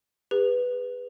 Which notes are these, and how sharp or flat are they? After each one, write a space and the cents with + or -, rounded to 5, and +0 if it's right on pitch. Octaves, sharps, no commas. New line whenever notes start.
G#4 -40 B4 +0